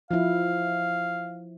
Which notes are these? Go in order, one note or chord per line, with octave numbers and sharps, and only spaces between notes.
F3 E4 F5